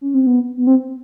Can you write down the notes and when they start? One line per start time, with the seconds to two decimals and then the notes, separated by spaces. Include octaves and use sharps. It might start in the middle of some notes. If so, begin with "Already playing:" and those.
0.01 C#4
0.14 C4
0.27 B3
0.58 B3
0.67 C4